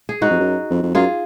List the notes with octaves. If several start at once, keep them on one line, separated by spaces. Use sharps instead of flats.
G#4
G#2 D#4 F#4
F2
F#2
F2
F2
F#2 F4 G#4